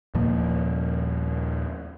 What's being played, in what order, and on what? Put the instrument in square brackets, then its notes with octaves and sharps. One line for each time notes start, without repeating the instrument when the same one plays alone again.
[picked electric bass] D#2 A#2 F3 A#3